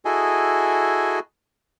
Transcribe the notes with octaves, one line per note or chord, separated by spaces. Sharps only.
E4 F#4 G#4 A4 D#5 G#5